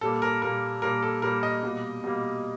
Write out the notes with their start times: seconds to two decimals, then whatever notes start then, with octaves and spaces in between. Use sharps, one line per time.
0.01 A#2 G3 A#3 A4
0.22 A#4
0.42 A#2 G3 A#3 A#4
0.82 A#2 G3 A#3 A#4
1.02 A4
1.22 A#2 G3 A#3 A#4
1.43 D#5
1.63 B2 G3 A#3
2.04 B2 G3 A#3